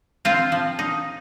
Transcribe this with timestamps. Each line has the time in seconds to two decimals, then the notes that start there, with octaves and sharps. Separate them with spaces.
0.25 C4 F4
0.52 F3
0.79 D#4